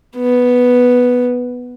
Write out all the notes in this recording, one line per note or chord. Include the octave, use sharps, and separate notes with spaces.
B3